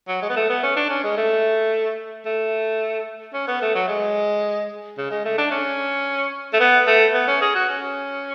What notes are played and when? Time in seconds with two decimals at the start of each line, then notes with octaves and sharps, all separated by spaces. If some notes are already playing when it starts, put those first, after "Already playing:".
0.08 F#3
0.22 G#3
0.29 B3
0.36 A3
0.49 B3
0.63 C#4
0.76 D4
0.90 C#4
1.03 G#3
1.17 A3
2.26 A3
3.34 C#4
3.48 B3
3.62 A3
3.75 F#3
3.88 G#3
4.98 C#3
5.11 G#3
5.25 A3
5.38 D4
5.51 C#4
6.53 A3
6.60 B3
6.87 A3
7.14 B3
7.28 C#4
7.41 G#4
7.55 F#4
7.68 C#4